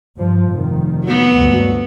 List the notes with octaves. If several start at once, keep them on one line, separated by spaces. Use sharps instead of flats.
G2 F3
F1 D#3
F#3 B3
D2 G2